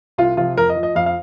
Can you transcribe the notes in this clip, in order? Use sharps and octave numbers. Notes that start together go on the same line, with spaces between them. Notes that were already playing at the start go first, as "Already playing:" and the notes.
C2 F4
C3 F3 F4
F2 A#4
D#5
F3
D#5
F2 F5
F5